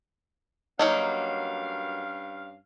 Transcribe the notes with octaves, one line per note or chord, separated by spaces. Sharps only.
G2 F#3 A#3 C#4 D#4 F5